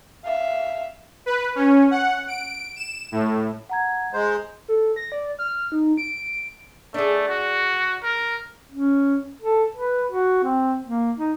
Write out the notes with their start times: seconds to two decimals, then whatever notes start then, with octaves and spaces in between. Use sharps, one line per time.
0.24 E5 F5
1.26 B4
1.55 C#4
1.91 F#5
2.28 D7
2.76 E7
3.12 A2
3.69 F#5 A#5 G#6
4.13 G#3 C5 A#5
4.68 A4
4.96 A#6
5.12 D5
5.39 F6
5.72 D#4
5.97 D7
6.94 A3 D4 G#4
7.28 F#4
8.03 A#4
8.72 C#4
9.42 A4
9.76 B4
10.12 F#4
10.44 C4
10.85 A#3
11.18 D#4